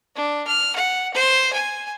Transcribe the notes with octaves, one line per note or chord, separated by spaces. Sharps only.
D4
F6
F#5
C5
G#5